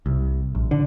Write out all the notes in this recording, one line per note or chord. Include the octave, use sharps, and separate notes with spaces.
C2
A#1
D3